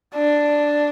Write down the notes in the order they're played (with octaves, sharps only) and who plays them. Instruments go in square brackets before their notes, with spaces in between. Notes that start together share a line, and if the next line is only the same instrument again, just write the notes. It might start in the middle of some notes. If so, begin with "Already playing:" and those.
[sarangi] D4